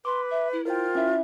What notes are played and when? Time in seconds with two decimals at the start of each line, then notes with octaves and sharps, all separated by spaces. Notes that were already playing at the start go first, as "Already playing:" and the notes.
0.05 B4 C6 D6
0.30 E5
0.52 E4
0.65 F4 A#4 C5 G5
0.95 C#4 E4 E5